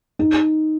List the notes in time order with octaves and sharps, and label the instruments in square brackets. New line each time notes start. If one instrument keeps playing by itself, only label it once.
[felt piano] D#4